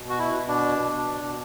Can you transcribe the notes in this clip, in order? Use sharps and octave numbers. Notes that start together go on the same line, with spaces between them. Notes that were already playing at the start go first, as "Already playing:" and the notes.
Already playing: B2
F#4
E4
B2
D4
B2
B2